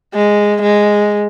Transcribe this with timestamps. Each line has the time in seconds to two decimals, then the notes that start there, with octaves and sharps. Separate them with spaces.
0.14 G#3
0.63 G#3